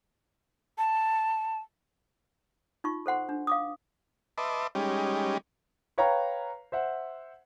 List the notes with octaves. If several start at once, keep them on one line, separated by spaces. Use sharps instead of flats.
A5
D#4 F4 C#6
A4 C5 F#5 C6
D4
F5 D6 D#6
B4 D#5 E5 A5 C6 D6
G3 G#3 C#4 D#4 G4
B4 C#5 F5 G5 A#5
C5 E5 F#5